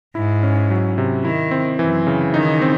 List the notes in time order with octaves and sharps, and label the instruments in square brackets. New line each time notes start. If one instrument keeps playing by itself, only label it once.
[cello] G#2 [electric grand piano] E4
[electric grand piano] C#4
F#3
C3
[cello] D#3 [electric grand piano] E4
[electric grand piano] C4
[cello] F#2 [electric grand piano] E3
[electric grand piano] C#3
[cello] D#3 [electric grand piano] D#4
[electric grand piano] C4